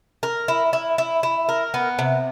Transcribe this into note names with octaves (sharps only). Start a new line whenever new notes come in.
A#4
E4
E4
E4
E4
A#4
B3
C3